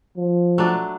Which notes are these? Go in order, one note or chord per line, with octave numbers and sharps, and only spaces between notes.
F3
F#3 A3 D4